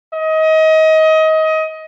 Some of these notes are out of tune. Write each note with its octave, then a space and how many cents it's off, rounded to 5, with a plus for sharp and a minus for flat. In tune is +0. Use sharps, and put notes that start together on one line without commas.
D#5 +25